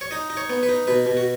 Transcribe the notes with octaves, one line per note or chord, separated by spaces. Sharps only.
C#5
D#4 D#5
D#4
C#5
B3
B4
D#4
B2 B4
B2
F#4